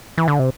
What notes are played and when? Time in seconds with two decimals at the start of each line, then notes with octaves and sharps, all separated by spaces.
0.18 E3
0.28 D3
0.39 C3